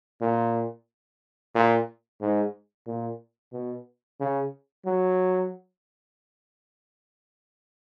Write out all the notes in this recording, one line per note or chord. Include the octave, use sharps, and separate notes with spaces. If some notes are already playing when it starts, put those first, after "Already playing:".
A#2
A#2
G#2
A#2
B2
C#3
F#3